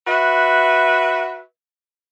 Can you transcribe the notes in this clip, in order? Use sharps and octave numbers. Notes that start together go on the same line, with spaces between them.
F#4 B4 E5